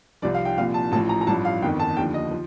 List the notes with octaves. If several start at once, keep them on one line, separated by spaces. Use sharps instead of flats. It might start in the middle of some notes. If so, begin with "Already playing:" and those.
C2 C3 F3 D5
F5
G5
C2 A#2 F3 F5
A5
A1 A2 F3 A5
A#5
A#5
A1 G2 F3 A5
F5
G1 F2 D#3 G5
A5
D#2 D3 F3 G5
D#5
F3